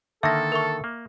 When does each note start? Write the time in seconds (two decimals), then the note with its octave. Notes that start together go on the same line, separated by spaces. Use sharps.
0.23 D3 D#3 A#3 A4 E5 A#6
0.52 A#4 E5 C#6
0.84 A#3